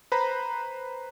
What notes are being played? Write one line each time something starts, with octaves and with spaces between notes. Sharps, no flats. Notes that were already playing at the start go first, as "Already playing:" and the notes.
B4 C5 A#5 B5